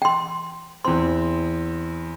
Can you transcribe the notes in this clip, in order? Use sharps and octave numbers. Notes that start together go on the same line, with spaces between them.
G5 C6
E2 C4 C6